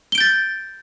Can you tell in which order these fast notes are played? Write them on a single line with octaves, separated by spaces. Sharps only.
G7 D7 G6 A6